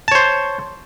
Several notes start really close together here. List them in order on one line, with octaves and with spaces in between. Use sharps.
A5 C#5 C5